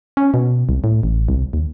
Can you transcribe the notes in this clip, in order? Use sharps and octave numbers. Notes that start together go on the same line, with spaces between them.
C#4
B2
C2
A2
A1
C2
D#2